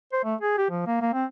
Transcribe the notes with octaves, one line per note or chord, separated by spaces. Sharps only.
C5
A3
G#4
G4
F3
A#3
A#3
C4